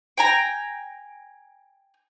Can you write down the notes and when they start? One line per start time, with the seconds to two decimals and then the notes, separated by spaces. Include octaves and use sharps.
0.18 G5 G#5 A#5